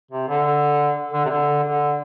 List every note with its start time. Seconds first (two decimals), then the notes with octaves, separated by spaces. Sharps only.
0.11 C3
0.28 D3
1.13 D3
1.25 C3
1.29 D3
1.63 D3